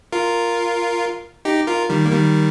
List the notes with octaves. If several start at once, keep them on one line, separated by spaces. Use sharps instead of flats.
F4 A#4
D#4 G4
F4 A#4
D#3 G3
A#3
D#3 G3